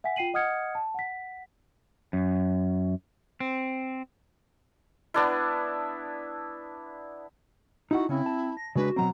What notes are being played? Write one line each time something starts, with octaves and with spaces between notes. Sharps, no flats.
E5 F#5 G#5 B6
F4 G5 C7 D#7 F#7
D#5 F#5 D#6 F6 G#6 C#7
A5
F#5 B6
F#2
C4
B3 D4 E4
D#4 E4 F#4 F#5
C#3 C4 C#4 E4
A5
A#6
C#3 G#3 D4 F#4 B4
B2 F#3 C4 A#5